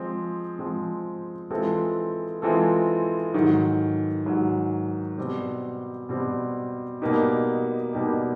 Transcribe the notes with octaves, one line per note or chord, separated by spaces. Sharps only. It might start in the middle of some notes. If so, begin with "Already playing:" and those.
Already playing: F3 G#3 C4
F3 G#3 C4
E3 G#3 C4 F4 A4
E3 G#3 C4 F4 A4
G#2 D#3 F#3
G#2 D#3 F#3
B2 G3 C4
B2 G3 C4
B2 G3 A#3 D#4 G4
B2 G3 A#3 D#4 G4